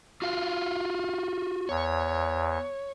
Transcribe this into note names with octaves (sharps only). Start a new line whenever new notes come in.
F4 F#4 F5
E2 C#5